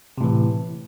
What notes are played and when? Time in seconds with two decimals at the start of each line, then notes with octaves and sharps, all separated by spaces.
0.18 C3
0.21 A2
0.24 E3